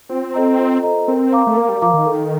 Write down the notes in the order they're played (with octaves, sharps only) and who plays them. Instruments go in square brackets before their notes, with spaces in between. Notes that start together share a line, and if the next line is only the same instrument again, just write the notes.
[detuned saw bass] C4 [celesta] F4
[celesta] A4 C5 D#5 A#5
F4
A4 C5 D#5 A#5
[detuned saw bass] C4 [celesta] A#4
[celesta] F5 A#5 D6
[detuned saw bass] A3
[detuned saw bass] A#3 [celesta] A#4
[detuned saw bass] G3
[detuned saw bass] F3 [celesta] F5 A#5 D6
[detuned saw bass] D#3
[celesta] A4